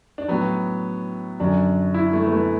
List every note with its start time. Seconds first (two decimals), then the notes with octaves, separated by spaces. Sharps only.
0.18 D4
0.28 A2 F#3 B3
1.40 F#2 D3 F#3 D4
1.94 E4
2.13 A3
2.26 B3
2.32 A3